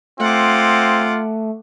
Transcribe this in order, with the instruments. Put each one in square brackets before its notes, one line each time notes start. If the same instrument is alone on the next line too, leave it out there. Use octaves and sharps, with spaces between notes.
[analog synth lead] A3 [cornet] C4 [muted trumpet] F4 [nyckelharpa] F#5 D6